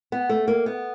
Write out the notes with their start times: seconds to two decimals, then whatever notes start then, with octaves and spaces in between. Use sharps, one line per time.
0.12 B3
0.29 A3
0.48 A#3
0.66 B3